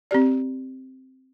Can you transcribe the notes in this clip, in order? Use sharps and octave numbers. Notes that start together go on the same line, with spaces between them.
C4 G4 D5